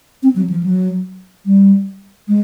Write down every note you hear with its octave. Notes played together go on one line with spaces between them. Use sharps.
C4
F#3
F3
F#3
G3
G#3